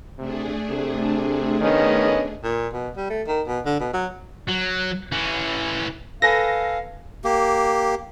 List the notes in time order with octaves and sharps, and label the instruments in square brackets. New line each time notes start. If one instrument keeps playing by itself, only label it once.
[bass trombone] C3 [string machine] A3 D4 G#4
[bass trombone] C3
[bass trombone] D#3 [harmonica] B3 C#4 D#5
[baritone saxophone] A#2
B2
G3
A3
D#3
B2
D3
B2
F#3
[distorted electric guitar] F#3
E3 C#4
[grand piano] A4 B4 G#5 [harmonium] F5 [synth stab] A#6
[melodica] A#3 G4